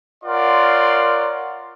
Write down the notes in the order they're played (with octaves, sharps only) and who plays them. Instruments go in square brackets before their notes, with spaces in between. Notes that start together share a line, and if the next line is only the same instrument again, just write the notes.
[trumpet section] F4 A#4 C#5 D5 F#5 C6